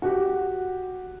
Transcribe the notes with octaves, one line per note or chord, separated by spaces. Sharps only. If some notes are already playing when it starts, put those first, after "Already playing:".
F#4 G4